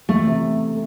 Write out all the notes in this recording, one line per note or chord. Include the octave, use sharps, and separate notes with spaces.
E2 A3
C3